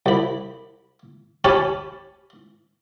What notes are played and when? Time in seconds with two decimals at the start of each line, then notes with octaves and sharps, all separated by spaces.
0.06 C2 B5
1.44 C#4 G4 C#5 G#5 A5 B5